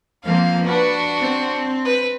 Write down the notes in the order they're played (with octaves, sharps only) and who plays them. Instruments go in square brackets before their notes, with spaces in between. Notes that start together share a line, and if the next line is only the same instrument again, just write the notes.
[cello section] F3 A#3 C4 [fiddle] F5
[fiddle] D4 F#4 [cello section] B4
[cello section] C4
[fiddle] B4